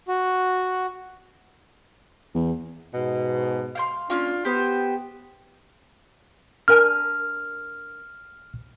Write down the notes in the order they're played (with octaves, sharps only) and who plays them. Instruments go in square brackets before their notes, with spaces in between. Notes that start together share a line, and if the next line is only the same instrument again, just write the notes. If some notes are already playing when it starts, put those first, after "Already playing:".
[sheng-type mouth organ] F#4
[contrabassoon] E2
[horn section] G#2 B2
[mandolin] F5 G5 C6
[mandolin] A#3 C#4 [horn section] D4 F4
[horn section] B3 [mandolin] G4 C5
[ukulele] D4 A#4 G#5 [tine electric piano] F6